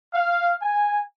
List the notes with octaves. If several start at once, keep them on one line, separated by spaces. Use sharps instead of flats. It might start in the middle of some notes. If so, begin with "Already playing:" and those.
F5
G#5